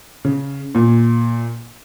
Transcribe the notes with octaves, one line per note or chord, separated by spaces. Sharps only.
C#3
A#2